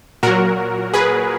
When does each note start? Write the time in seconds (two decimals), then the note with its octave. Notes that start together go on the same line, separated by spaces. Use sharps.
0.23 A#2 F#3 F#4 A#4
0.94 G#4 B4